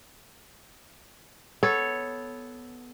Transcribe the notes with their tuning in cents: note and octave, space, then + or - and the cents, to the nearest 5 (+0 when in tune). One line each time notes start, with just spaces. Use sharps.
B3 +0 A4 -10 C#5 +0